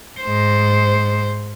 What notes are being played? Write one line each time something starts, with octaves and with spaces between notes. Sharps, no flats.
G#2 C5